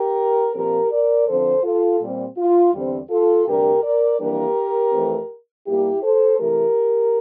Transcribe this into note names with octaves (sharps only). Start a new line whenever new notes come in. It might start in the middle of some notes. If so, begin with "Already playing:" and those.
Already playing: G4 A#4
A#2 F3 C4 G4 A#4
A#4 D5
F2 D3 F3 C4 A4 C5
F4 A4
A#2 G3 C4
F4
E2 D3 G3 C4
F4 A4
D2 C3 G3 D4 G4 A#4
A#4 D5
F2 E3 G3 A#3 D4 G4 A#4
F2 E3 A3 C4
A#2 G3 A#3 E4 G4
A4 C5
C3 E3 A3 G4 A#4